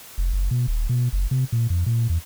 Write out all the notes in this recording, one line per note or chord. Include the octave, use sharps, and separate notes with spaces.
F1
F#1
B2
D#1
B2
F#1
C3
A#2
F2
A#2
E2